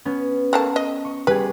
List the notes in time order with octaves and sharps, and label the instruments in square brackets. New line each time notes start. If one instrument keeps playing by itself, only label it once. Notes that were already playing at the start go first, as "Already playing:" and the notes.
[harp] B3 C#4
[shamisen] A3 A#3 A5
D#5
[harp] C#6
[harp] G3 G#4 [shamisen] B4